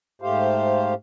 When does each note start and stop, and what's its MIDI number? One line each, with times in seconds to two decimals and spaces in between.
0.22 0.94 44
0.22 0.94 57
0.22 0.94 67
0.22 0.94 72
0.22 0.94 77